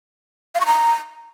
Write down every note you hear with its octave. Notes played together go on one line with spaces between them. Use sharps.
F5
C#6
A#5